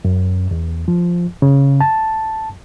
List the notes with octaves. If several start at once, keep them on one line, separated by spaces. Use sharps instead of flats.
F#2
E2
F3
C#3
A5